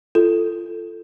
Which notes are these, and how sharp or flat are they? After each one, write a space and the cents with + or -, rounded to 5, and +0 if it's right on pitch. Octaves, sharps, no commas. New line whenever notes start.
F4 -20 A4 +0